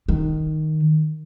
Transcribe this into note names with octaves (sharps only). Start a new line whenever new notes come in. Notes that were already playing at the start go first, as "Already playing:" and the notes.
D#3